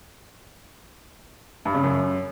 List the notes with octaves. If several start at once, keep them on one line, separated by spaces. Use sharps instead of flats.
G2
C#3
F#2